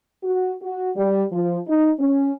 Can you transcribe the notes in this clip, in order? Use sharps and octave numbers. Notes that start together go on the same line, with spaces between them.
F#4
F#4
G3
F3
D#4
C#4